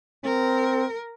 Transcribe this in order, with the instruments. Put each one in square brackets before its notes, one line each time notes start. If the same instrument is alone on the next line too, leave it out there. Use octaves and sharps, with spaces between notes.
[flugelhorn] C4 [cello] A#4